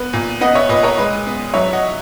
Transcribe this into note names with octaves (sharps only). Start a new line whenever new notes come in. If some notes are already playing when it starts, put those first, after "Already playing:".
Already playing: B3 B4
A#2
B3 D#5 F#5
C#5 E5
A#2 B4 D#5
A#4 C#5
G#3 B4 D#5
B3
F#3 C#5 E5
D#5 F#5